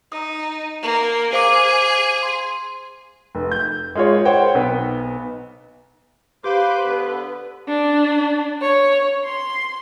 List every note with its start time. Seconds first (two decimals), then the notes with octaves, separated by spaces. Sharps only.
0.12 D#4 D#6
0.82 A#3
1.33 G#4 C5 F5 D6
2.23 C6
3.35 F1
3.52 G6
3.96 G#3 F4 C#5
4.25 C5 C#5 F#5 G5
4.54 B1 B3
6.44 G4 B4 C5 F5 C6 D6
6.85 D3 B3
7.67 D4
8.61 C#5
9.24 C6